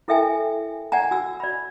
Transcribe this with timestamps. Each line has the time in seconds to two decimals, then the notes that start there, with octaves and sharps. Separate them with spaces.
0.08 E4 A4 A#4 E5 G5 G#5
0.92 D5 F#5 G#5 A#5
1.11 F#4 E6
1.40 D5 B5